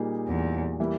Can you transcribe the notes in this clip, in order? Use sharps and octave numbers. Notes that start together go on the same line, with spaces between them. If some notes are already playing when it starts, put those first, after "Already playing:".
Already playing: A#2 G3 A#3 D#4 G#4
E2
E3 G3 A#3 E4